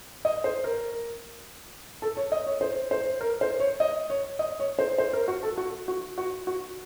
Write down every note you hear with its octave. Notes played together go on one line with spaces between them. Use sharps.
D#5
C5
A#4
A4
C#5
D#5
C#5
C5
C5
A#4
C5
C#5
D#5
C#5
D#5
C#5
C5
C5
A#4
F#4
A4
F#4
F#4
F#4
F#4